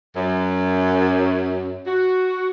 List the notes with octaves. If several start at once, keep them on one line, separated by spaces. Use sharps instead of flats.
F#2
F#4